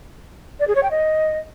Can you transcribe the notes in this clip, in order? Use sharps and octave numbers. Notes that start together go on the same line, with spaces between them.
D5
G#4
C#5
G5
D#5